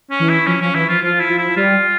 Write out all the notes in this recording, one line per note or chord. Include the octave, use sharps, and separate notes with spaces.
C#4
E3
E4
F3 C#4
F3 C#4
E3 E4
F3 F4
F3 F4
E4
F3
E4
G3 F4